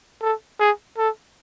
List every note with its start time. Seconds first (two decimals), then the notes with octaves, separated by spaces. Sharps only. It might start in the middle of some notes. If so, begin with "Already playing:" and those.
0.22 A4
0.60 G#4
0.98 A4